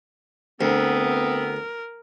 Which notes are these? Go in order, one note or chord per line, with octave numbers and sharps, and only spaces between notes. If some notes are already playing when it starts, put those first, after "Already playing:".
D2 E3 B3 C4 A#4